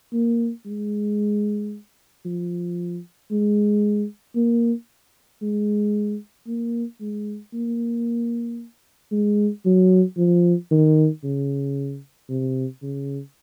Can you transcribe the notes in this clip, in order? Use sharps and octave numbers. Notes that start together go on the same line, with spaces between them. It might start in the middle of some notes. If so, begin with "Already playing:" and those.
A#3
G#3
F3
G#3
A#3
G#3
A#3
G#3
A#3
G#3
F#3
F3
D#3
C#3
C3
C#3